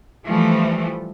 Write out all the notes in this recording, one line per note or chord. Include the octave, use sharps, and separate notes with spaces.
E3 F3 G3 A3